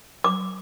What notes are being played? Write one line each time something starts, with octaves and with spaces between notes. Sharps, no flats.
D6